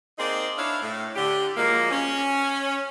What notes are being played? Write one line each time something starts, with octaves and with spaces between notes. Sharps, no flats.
A#3 C4 D#4 G#4 C5 D5
D4 E4 C#5 F5
A2
D3 G4
F3 F#3 G#3 A#3
C#4